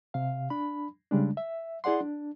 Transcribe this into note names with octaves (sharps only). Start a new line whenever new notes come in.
C3 F5
D4 B5
C#3 G3 G#3 D4
E5
E4 G#4 D5 F#5 C6
D4